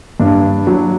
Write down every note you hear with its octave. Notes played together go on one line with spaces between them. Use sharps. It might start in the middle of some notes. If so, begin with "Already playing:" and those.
G2 D4
F#3